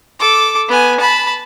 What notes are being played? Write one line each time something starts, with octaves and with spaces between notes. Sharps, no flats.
A4 D6
B3 G#5
A5 B5